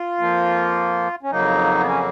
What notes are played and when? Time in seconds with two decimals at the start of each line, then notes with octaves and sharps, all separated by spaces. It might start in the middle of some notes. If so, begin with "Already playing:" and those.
Already playing: F4
0.18 F2 F3 A#3
1.23 C#4
1.31 F2 C#3 F#3 A#3 D#4
1.79 B3
1.88 C#4